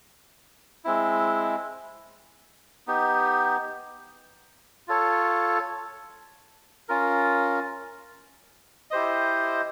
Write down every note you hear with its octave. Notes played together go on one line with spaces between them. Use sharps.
G#3 C4 E4
B3 D#4 G4
F4 A4 C#5
C#4 F4 A#4
E4 G4 C5 D#5